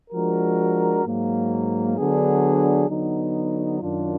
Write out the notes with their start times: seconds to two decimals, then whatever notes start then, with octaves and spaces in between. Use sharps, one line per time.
0.10 F3 G#3 D4 F#4 A#4
1.03 G#2 F#3 A#3
1.96 D3 F#3 B3 D4 G#4
2.88 D3 F#3 B3 D#4
3.81 F#2 D#3 F#3 D4 F4